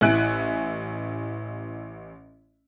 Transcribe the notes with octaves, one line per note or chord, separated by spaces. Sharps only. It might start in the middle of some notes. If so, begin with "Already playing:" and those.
A1 E4 E5 G#5 F#6 D7